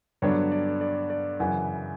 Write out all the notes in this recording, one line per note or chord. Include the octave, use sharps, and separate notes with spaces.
G2 D3 F#3 B3 D4 C#5
D5
D5
D5
F#2 C#3 E3 F#5